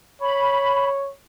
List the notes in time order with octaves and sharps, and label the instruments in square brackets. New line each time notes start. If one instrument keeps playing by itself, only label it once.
[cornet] C#5 [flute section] B5